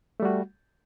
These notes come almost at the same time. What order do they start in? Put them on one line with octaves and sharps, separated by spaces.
A3 G3 F#4